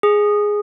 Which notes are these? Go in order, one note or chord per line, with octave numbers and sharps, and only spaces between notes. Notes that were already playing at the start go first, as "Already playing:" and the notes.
G#4